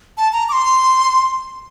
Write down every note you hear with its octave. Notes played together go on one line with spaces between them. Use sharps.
A5
A#5
D6
C6